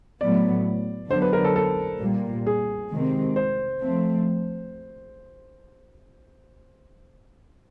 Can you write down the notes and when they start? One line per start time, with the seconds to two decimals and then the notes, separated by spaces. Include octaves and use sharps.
0.21 A2 F#3 B3 D5
1.10 D3 F#3 B3 C5
1.22 B4
1.33 A#4
1.45 A4
1.56 A4
2.00 A#2 G3 A#3
2.47 G#4
2.91 C3 D#3 G#3 C4
3.36 C5
3.82 F3 A3 C4